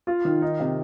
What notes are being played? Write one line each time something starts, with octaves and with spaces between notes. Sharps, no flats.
F4
D#3
D#4
C3